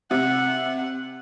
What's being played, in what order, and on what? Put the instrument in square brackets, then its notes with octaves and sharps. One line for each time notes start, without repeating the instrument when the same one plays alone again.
[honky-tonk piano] C3 [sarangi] F#5